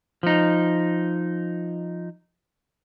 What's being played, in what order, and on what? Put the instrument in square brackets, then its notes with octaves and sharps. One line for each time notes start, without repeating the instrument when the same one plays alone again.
[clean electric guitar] F3 D#4